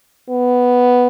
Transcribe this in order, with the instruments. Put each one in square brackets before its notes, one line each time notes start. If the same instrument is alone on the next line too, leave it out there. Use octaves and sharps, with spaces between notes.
[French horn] B3